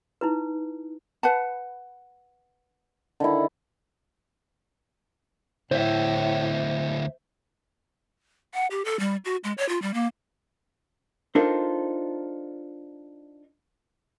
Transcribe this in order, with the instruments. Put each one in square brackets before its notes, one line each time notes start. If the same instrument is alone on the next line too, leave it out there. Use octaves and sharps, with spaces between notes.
[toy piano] D#4 E4 B4
[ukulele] B4 F#5 A5
[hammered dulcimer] D3 D#3 E4
[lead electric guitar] D2 E4 [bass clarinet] A2 [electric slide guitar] C5 E5
[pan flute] F#5
G4
A4
G3
F#4
G#3
C#5
F4
G3
A#3
[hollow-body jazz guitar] D4 D#4 F4 A4 A#4 C5